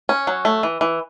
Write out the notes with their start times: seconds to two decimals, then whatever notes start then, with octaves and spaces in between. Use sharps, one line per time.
0.09 C#4
0.27 F#3
0.45 A3
0.63 E3
0.81 E3